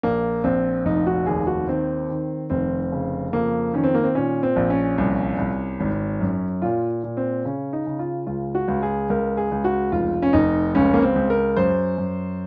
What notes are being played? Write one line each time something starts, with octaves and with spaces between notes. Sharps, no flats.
A#1 A#3
A#1 C4
F1 D#4
F#4
D#2 G#4
F#4
D#3 C4
D#3
F1 C4
C#3
F2 A#3
D#3 C#4
C4
A#3
C4
A#2 C#4
C4
A#1
C#4
C2
C2
G#1
F#2
A#2 F4
A#2
C4
C#3 C#4
D#4
C#3
F4
C#2 F4
F#4
C#2
G#4
C#2 A#4
G#4
C#2
F#4
F1 F4
C#4
F1 D#4
C#2 C#4
A#3
C4
C#2
A#4
F#2 C5
F#2